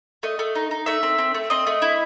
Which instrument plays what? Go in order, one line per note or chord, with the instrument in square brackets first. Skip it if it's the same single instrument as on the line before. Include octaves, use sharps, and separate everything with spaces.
[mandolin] A3 D#5
A3
D#4
D#4
A3 E5
C4
C4
A3
C4 D#5
A3
E4